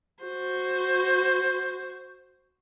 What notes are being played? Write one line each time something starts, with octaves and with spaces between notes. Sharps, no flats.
F#4 C5